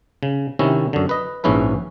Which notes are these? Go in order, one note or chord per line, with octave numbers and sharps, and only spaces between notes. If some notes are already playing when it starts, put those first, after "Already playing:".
C#3
C3 D#3 C#4 E4
F#2 D3
B4 D#5
A#1 G#2 C#4 E4 B4